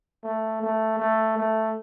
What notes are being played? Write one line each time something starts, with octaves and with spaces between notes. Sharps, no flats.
A3
A3
A3
A3